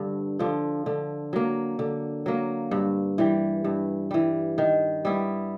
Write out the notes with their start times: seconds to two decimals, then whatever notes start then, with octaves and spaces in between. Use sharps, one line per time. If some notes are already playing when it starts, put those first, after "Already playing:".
Already playing: G2 D3
0.39 D3 F3
0.86 D3
1.33 F#3 A#3
1.79 D3
2.26 F#3 A#3
2.71 G2
3.18 E3 G3
3.64 G2
4.11 E3 G3
4.58 D#3
5.05 G3 B3 E4